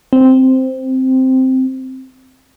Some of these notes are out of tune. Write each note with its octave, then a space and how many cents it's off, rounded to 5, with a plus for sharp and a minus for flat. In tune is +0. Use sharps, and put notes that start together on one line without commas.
C4 -5